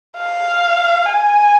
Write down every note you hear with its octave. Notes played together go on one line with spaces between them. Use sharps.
F5
G#5